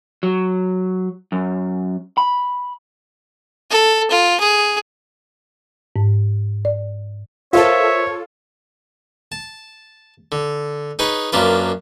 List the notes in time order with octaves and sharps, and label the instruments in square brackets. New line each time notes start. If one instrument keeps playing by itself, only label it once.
[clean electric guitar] F#3
F#2
B5
[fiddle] A4
F4
G#4
[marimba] G#2
D5
[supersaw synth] F4 A4 [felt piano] A#4 C5 F5 [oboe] C#5 [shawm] E5
[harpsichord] A5
D3
D#4 G#4 B4 C#5
F#2 A#3 D4 F4 B4